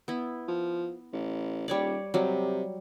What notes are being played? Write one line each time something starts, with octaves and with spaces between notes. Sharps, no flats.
B3 E4
F3
A1
D#1 G3 C#5 D5
C3 F#3 G3